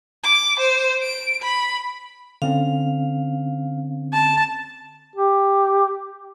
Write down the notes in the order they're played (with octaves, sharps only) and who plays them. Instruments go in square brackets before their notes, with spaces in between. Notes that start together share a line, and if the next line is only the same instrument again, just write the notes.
[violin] D6
C5
D7
B5
[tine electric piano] D3 C4 C#4 [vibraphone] F5
[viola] A5
[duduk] G4